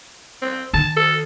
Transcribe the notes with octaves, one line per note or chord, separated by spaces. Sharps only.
C4
D#3 A5
A4